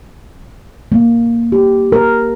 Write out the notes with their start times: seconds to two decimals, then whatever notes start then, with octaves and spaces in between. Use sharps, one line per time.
0.92 A#3
1.52 G4
1.92 A#4